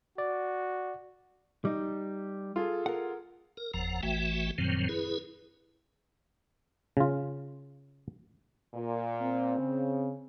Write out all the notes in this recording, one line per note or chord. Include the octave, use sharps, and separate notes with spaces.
F#4 D5
G3 D#4
F4 G#4 A4
A#4 F#5
A#4
F#1 E2 F3 F#5 A#5
A1 E3 A3 F#4 E5 G5
F#2 A#2 D#3 F3 F#3 C4
E4 G#4 B4
C#3 F4
A#2
C4
C#3